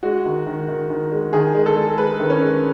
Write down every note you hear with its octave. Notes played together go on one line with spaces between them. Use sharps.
G#3 F#4
D#3
D#3
D#3
D#3
G#3
D#3 G#4
G#3
A4
G#3
G#3 B4
D#3
C#4
G#3